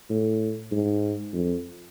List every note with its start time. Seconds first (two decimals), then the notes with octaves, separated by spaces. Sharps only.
0.10 A2
0.72 G#2
1.33 F2